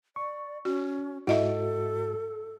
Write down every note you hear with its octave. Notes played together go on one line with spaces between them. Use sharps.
D5 C#6
C#4 F#4
G#2 E4 F#4 A4 D#5 E5